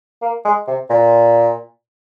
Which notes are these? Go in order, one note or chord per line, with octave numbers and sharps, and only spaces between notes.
A#3
G#3
C3
A#2